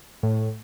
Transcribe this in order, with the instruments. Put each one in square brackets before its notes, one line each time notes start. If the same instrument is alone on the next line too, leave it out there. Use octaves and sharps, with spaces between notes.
[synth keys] A2